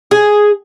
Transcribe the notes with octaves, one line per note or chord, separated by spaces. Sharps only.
G#4